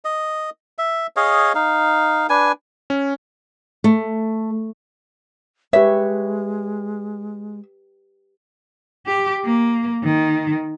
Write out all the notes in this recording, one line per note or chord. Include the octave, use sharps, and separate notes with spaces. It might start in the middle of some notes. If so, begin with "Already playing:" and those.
D#5
E5
G#4 C#5 D#5 F5
D#4 F5
D4 B4 G#5
C#4
A3
G#3 G4 B4 C#5 E5
G4
A#3
D#3